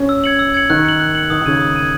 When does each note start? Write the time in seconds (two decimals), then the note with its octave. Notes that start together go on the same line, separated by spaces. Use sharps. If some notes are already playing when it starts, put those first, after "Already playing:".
Already playing: C#4
0.09 E6
0.24 G#6 C#7 F#7
0.39 E6
0.54 G#6 C#7 F#7
0.70 D#3 F#6
0.85 C#7 F#7
1.00 F#6
1.15 C#7 F#7
1.30 D#3 D#6
1.41 D#3
1.46 C#3 G#6 D#7
1.60 D#6
1.76 G#6 D#7